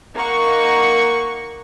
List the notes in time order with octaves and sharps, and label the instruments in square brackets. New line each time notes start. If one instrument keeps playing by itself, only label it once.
[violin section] A#3 D#4 F#5 C#6